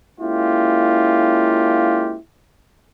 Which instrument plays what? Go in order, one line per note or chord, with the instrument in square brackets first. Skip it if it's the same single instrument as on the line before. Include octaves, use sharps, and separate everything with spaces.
[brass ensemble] G#3 A#3 C#4 E4 F4 G4